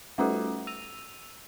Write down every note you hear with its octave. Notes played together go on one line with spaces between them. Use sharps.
G3 A3 C#4 F4 F#4 A4
E6 D#7 F7